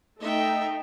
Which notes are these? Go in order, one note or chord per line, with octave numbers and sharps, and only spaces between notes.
A3 D#4 E5 G5